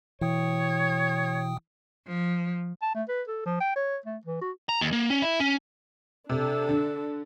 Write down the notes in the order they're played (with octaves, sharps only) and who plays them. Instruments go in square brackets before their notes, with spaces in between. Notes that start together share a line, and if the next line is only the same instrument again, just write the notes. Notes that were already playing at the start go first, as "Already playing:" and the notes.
[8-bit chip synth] B2 G5 D#6 [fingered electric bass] E3 [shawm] C#5
[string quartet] F3
[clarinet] A5
A3
B4
A4
F3
G5
C#5
A3
E3
F#4
[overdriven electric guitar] A#5
D#2
A#3
C#4
E4
C#4
[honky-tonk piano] C3 [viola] D4 A4
[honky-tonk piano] D3